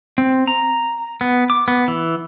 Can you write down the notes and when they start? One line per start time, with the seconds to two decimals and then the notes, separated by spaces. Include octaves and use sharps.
0.18 C4
0.47 A#5
1.21 B3
1.50 D6
1.68 B3
1.88 E3